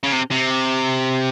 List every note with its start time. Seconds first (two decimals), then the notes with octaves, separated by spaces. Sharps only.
0.03 C#3
0.12 C3
0.31 C3